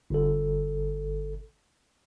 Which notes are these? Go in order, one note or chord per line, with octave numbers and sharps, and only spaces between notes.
G1 A4